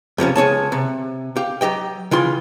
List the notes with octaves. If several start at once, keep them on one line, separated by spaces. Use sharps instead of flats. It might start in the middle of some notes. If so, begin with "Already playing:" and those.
F2 C3 F3 C#4
C#2 G#4 C#5 A5
C3
G4 F5
F#3 G4 D#5 G5
C#3 E3 F4 C6